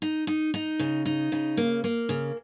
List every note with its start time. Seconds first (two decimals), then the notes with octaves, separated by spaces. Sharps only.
0.02 D#4
0.27 D#4
0.54 D#4
0.79 C#3
1.05 D#4
1.32 C#3
1.57 A#3
1.84 A#3
2.09 C#3